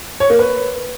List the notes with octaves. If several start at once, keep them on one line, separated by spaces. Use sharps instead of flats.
C#5
A#3
B4